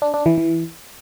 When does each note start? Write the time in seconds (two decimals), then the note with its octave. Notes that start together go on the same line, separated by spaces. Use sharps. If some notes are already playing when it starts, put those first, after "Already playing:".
0.02 D4
0.14 D4
0.26 E3
0.38 E3